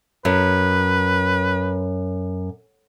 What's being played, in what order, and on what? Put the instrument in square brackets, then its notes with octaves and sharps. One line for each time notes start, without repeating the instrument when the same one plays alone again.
[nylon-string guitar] F#2 [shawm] B4